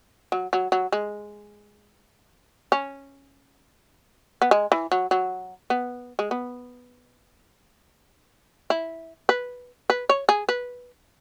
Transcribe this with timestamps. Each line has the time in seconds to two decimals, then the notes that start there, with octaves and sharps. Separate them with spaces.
0.32 F#3
0.53 F#3
0.72 F#3
0.92 G#3
2.72 C#4
4.42 B3
4.51 G#3
4.72 E3
4.92 F#3
5.11 F#3
5.70 B3
6.19 G#3
6.31 B3
8.70 E4
9.29 B4
9.90 B4
10.09 C#5
10.29 G#4
10.49 B4